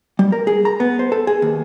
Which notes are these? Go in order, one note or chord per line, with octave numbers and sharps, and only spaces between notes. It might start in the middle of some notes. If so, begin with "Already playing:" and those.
G3
A#4
G#4
A#5
B3
C5
A4
G#4
D#2